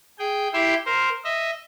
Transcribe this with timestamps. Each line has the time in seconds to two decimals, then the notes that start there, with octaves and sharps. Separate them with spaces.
0.19 G#4 G5
0.53 E4 G4 E5 G5 C6
0.86 A#4 C5
1.24 D#5 E5